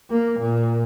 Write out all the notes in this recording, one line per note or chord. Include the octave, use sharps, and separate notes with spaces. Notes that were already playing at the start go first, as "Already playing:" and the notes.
A#3
A#2